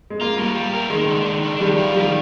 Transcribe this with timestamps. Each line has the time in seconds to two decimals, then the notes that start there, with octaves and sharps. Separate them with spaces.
0.10 G#3
0.20 A#3 F4
0.38 G3
0.55 G3
0.73 A#4
0.90 D#3 G#3
1.08 D4
1.25 D#3
1.43 D4
1.61 D#3 G3
1.78 F4
1.95 D#3 G3